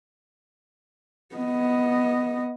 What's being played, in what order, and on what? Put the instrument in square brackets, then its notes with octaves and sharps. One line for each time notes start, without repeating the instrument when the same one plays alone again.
[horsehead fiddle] B3 D#5